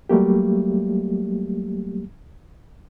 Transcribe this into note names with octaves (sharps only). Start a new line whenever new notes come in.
F#3 G3 A3 A#3 G4